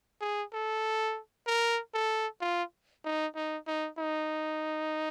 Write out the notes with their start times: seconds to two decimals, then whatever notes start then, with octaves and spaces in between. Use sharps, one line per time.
0.21 G#4
0.53 A4
1.47 A#4
1.94 A4
2.41 F4
3.04 D#4
3.35 D#4
3.67 D#4
3.98 D#4